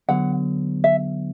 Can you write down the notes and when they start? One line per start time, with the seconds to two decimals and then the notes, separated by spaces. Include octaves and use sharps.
0.09 D3 F#3 B3 F#5
0.84 E5